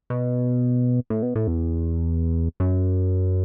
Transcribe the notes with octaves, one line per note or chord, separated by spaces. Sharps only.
B2
A2
B2
A2
E2
F#2